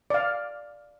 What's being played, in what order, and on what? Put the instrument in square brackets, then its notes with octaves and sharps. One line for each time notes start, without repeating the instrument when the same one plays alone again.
[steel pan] D5 F5